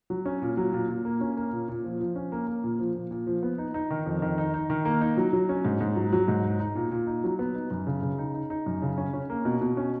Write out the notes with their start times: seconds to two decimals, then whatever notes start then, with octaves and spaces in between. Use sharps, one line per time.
0.10 F#3
0.26 C#4
0.42 A#2
0.57 F#3
0.73 A#2
0.89 A#2
1.05 A#3
1.21 C#4
1.37 A#3
1.52 A#2
1.68 A#2
1.84 F3
2.00 F3
2.16 C#4
2.32 A#3
2.47 A#3
2.64 A#2
2.79 F3
2.95 A#2
3.11 A#2
3.27 F3
3.43 B3
3.58 D#4
3.74 D#4
3.90 D#3
4.06 F2
4.22 D#3
4.38 D#4
4.54 D#4
4.70 D#3
4.85 A#3
5.01 D#4
5.17 F#3
5.33 F#3
5.49 C#4
5.65 G#2
5.81 G#2
5.96 F#3
6.12 F#3
6.28 G#2
6.44 D#4
6.60 D#4
6.75 A#2
6.91 A#2
7.07 D#4
7.24 F#3
7.39 B3
7.55 D#4
7.71 F#2
7.87 C#3
8.02 C#3
8.18 D#4
8.34 D#4
8.50 D#4
8.66 F#2
8.82 C#3
8.98 C#4
9.14 C#4
9.30 A#3
9.45 B2
9.61 B2
9.77 C#4